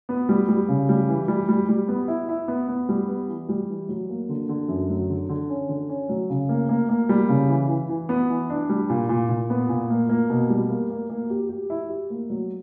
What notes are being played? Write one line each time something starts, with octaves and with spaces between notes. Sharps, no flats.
B3
G3
G3
C#3
G3
E3
G3
G3
G3
B3
E4
E4
B3
B3
G3
B3
E3
G3
E3
F#3
A#3
D3
D3
F#2
F#3
D3
D3
C#4
D3
C#4
F#3
C#3
A#3
A#3
A#3
G3
C#3
E3
E3
E3
B3
E3
D4
G3
A#2
A#2
A#2
B3
A#2
A#3
A#3
B2
G3
A#3
A#3
A#3
G4
G4
E4
G4
A#3
F#3